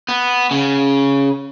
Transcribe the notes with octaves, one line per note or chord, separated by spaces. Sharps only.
B3
C#3